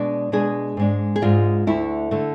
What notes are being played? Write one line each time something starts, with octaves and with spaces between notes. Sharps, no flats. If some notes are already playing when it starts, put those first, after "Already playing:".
Already playing: B2 G#3 D4 D5
B2 G#3 D4 G#4
G#2 G#3 D4
G#4
G#2 G#3 D4 F4
D2 D3 A3 E4
D3 A3